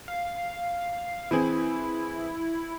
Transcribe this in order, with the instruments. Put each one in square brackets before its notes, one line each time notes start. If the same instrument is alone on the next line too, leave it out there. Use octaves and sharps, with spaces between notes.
[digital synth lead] F5
[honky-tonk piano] E3 C4 G#4 [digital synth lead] E4